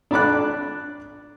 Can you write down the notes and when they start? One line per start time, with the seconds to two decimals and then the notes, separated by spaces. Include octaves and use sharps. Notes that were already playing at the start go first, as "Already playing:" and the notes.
0.11 D4 B5 D6 F#6